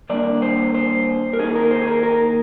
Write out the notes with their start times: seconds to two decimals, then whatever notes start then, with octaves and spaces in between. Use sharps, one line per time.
0.10 D#3 G3 A#3 D4 D5
0.42 C5
0.74 C5
1.33 A#4
1.38 D#3 A#3 D#4 G#4
1.55 A#4
1.71 C5
1.81 G#4
1.88 A#4
2.03 A#4